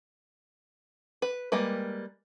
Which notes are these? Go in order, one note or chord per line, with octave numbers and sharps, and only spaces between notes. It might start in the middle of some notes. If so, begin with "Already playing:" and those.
B4
G3 G#3 A#3 B4